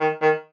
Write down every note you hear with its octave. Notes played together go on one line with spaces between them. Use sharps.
D#3
D#3